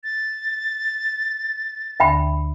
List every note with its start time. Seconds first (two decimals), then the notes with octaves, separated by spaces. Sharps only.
0.04 A6
2.00 D2 D3 E5 G5 A5 B5